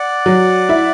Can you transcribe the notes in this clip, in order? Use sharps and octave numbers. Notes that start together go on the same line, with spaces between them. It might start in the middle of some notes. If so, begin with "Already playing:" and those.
Already playing: D5 F#5
F#3
E4